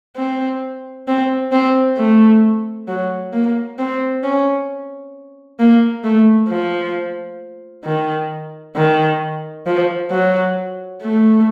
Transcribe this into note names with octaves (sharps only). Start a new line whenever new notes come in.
C4
C4
C4
A3
F#3
A#3
C4
C#4
A#3
A3
F3
D#3
D#3
F3
F#3
A3